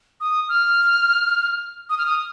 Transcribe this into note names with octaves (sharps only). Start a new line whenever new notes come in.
D#6
F6
D#6
F6
D#6